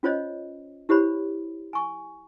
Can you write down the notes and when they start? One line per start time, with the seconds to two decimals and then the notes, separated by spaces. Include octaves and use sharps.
0.03 C#4 F4 C5 C#5 D#5
0.89 E4 G4 C5 C#5 B5
1.73 G#5 C#6